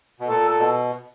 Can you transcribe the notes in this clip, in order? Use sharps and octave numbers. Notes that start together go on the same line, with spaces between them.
B2
A#2 A4
A4
B2